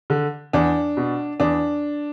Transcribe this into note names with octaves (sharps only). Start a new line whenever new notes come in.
D3
E2 D4
B2
E2 D4